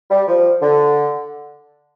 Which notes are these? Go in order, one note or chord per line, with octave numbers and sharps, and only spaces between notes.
G3
F3
D3